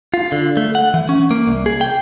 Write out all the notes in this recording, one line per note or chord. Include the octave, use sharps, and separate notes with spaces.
F4
D3
A3
F#5
E3
C#4
A#3
C2
G#4
G5